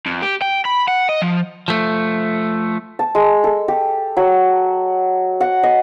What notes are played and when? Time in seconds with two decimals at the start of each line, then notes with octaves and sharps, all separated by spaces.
0.06 F2
0.22 G4
0.42 G5
0.65 B5
0.88 F#5
1.09 D#5
1.22 F3
1.68 F3 A3
2.99 A5
3.15 G#3
3.44 A4
3.68 G4
4.17 F#3
5.41 F#5
5.63 D#5